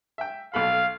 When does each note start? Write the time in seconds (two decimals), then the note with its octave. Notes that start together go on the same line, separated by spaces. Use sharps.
0.18 E5 G5
0.54 B1 A4 F5 B5